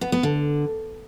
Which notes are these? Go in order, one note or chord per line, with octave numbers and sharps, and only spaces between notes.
B3
B3
D3